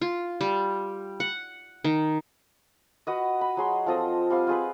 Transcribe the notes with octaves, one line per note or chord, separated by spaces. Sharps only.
F4
G3
F#5
D#3
F#4 B4 D#5
B5
F#3 G#4 C6
F3 C4 A4 D#5
G3 C4 F5
F4 G#4 B4